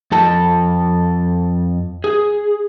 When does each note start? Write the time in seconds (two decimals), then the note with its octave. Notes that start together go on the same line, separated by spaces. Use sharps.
0.12 F2 A4 A5
2.04 G#4